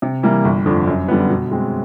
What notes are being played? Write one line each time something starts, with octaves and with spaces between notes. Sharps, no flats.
C3
E3 G3 A#3
G1
F2 D3
F#2
D3 G3 B3
B2
G#3 C4